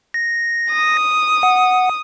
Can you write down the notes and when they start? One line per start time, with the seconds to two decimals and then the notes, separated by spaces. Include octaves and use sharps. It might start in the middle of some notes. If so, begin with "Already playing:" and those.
0.14 A#6
0.71 D#6
1.43 F#5